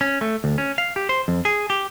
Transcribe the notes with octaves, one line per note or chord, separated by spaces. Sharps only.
C#4
A3
D2
C#4
F5
G4
C5
F2
G#4
G4